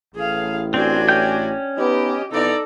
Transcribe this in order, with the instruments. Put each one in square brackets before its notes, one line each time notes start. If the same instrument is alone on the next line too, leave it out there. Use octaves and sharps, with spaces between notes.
[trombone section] A1 A2 [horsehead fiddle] G#4 F5
[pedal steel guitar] C4 [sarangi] D4 [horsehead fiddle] F#4 G#5
[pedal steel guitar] C#4 G5 G6
[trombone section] B3 D#4 B4 [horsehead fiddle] G4 [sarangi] D#5
[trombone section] C3 B3 E4 [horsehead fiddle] D#4 D5 [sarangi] A4